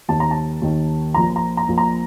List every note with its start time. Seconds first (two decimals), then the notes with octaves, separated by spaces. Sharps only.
0.09 D#2 D#3 A5
0.20 A#5
0.31 A5
0.62 D#2 D#3
1.14 A#1 A#2 F3 A#5
1.36 A#5
1.57 A#5
1.68 A#1 A#2 F3
1.78 A#5